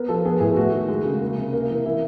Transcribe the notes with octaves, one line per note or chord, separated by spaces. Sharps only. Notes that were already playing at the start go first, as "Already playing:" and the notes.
Already playing: B3 A#4
F3 A4
B3 G#4
A2 G#4
A3 F#4
D#3
G#3
C#3
A#3
C3
A#3
E3
A#3 E4